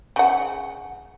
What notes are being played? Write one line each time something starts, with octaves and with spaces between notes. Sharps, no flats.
C#3 F#5